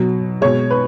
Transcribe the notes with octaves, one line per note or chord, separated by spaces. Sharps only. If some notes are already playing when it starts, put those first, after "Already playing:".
Already playing: B2 F#3
B2 G#3 C#5
B4